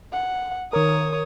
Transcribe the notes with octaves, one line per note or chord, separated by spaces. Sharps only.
F#5
D#3 A#4 C#5 D#6